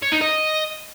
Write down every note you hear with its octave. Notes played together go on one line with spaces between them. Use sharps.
C#5
D#4
D#5